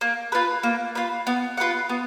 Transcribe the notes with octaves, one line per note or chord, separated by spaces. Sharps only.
A#3
F4 B4
A#3
F4 B4
B3
F4 B4 F#5
B3